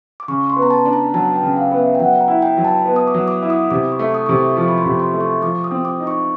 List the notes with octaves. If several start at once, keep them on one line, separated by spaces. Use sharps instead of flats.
D6
C#3 C#6
C6
B3
A#5
A5
D4
A#5
F#3 A5
G5
C#3
F5
B3
E5
G5
F#3 F#5
A#5
E4
G5
F#3
A5
B3
D#6
D6
F#3
D6
E4
D#6
C3 D6
C#6
A3
D#6
C3 C#6
D6
F3 C#6
B5
C6
C3
C6
A3
C#6
F3 D6
D#6
C4
D6
D#4
C#6